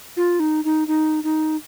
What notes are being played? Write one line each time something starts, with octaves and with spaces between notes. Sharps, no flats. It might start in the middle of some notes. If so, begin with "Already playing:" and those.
F4
D#4
D#4
D#4
D#4